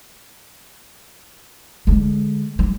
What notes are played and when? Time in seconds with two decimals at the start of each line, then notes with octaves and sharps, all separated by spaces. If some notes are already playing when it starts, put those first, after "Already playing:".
1.87 D3 G#3
2.59 G3